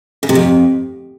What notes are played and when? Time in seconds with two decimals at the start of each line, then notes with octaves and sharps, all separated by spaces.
0.23 C#3
0.29 C3
0.35 F2